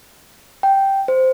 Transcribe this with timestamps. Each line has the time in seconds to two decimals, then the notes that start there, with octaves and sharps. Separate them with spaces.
0.63 G5
1.08 C5